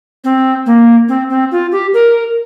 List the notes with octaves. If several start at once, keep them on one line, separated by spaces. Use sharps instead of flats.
C4
A#3
C4
C4
F4
G4
A#4